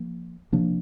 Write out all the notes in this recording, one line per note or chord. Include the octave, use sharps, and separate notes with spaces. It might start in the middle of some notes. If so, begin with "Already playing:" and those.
Already playing: F3 A#3
C3 F3 A#3 D4